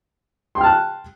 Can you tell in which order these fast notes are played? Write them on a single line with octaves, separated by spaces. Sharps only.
C6 G5 F6 A5 F#6